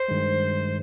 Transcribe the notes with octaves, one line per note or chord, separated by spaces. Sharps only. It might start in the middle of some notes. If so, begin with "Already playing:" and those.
Already playing: C5
G2 D#3 G#3